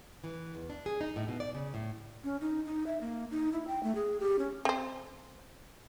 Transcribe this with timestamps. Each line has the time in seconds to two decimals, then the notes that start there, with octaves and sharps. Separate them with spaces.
0.24 E3
0.55 E2
0.70 D4
0.86 G#4
1.01 D#4
1.16 A2
1.28 B2
1.40 D5
1.55 C#3
1.74 A2
2.24 C#4
2.41 D#4
2.66 D#4
2.87 E5
3.01 A#3
3.31 D#4
3.52 E4
3.68 G5
3.83 A3
3.95 G#4
4.20 G4
4.39 C#4
4.65 C4 C5